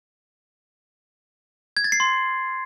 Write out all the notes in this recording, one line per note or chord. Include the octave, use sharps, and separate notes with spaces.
G#6
A6
C7
C6